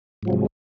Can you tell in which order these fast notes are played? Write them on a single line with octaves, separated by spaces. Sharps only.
G#2 F3 F#3 C3 G#3